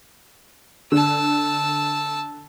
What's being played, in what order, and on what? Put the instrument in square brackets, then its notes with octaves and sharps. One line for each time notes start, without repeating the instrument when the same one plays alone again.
[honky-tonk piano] D3 [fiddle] A5 E6